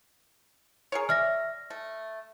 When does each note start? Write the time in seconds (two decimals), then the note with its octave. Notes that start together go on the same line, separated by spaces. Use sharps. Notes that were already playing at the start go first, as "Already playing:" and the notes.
0.92 G#4 A#4 C#5
1.09 D5 E5 F6 A#6
1.70 A3